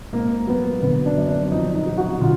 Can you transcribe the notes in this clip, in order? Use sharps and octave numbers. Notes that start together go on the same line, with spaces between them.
G#2 A#3
F#3 B3
D3 B3
D4
F#2
D4
F2 D#4
D#4
F#3
F#4
D3 F4